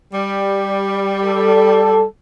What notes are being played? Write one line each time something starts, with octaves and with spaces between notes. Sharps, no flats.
G3
A4